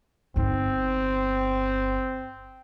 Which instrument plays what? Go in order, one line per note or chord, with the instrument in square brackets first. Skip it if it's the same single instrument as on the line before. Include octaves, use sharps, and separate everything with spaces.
[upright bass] G1 D#4 [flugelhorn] C4